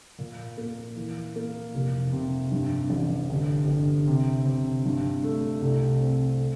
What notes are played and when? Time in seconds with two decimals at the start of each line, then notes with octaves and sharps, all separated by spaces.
0.18 A#2
0.57 A#3
0.96 E3
1.36 A#3
1.75 F1
2.12 C3
2.51 G2
2.90 A1
3.30 G1
3.68 G1
4.07 C3
4.45 C3
4.85 G2
5.24 A3
5.62 C2
6.01 C4
6.40 A3